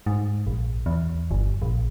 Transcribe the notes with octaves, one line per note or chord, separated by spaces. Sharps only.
G#2
A#1
E2
G1
A#1